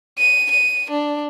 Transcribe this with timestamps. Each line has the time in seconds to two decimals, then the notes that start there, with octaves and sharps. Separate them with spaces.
0.18 D#7
0.51 D#7
0.90 D4